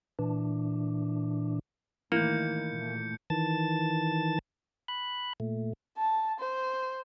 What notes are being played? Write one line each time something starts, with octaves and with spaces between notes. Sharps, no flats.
A#2 E3 D4
A2 D#3 E3 A#3 G6 C#7
A#2 A3
D#3 E3 A5 A6
B5 F#6
A#2 A3
A5
C5